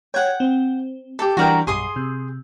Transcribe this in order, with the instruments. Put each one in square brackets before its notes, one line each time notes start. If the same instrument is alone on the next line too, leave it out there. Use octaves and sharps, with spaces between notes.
[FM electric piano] C#5 G#6 [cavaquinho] F#5 G5
[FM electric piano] C4
[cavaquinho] G4 A4
[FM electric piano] E3 G3 D4 [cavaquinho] F#4 A#4 G5
[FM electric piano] B1 G2 [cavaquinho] G#4 C6 D#6
[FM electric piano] C3